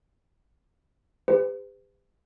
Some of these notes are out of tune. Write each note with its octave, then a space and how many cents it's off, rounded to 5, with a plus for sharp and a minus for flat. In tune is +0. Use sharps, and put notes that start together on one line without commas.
G4 +40 B4 +45